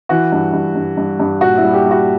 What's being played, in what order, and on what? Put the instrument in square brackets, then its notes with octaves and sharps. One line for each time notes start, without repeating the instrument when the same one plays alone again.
[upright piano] E3 F#4
G2
G2
G2
G2
G2
A#2 F#4
E4
G3
G4
G3
F#4